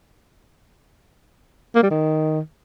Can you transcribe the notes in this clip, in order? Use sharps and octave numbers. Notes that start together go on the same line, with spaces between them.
A#3
G3
D#3